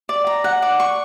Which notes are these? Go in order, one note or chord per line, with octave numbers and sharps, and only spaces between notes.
D5
A#5
F#5
D5
C#6